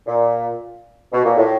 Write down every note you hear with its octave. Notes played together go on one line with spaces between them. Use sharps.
A#2
B2
A#2
A2